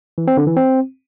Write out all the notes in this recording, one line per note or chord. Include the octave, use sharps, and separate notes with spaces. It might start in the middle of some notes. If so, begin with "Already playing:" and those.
E3
C4
D3
E3
C4